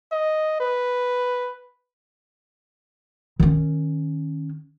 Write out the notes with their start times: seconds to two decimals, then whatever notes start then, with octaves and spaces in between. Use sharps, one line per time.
0.12 D#5
0.60 B4
3.40 D#3 C#4